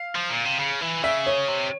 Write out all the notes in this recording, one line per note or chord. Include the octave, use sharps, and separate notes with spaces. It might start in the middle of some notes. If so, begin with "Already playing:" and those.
Already playing: F5
F3
A#2
C3
C#3
E3
C#3 E5
C#5
C3